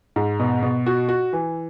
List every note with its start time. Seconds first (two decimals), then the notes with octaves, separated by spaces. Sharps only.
0.16 G#2
0.40 B2
0.62 B2
0.86 F#4
1.09 F#4
1.33 E3